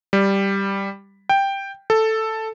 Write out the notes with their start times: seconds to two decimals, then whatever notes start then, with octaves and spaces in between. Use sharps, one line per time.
0.13 G3
1.29 G5
1.90 A4